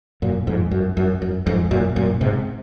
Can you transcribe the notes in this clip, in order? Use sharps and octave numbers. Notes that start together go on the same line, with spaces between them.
F#2 A#2
F2 G#2
F#2
F#2
F#2
F2 G#2
F#2 A#2
F#2 A#2
G#2 C3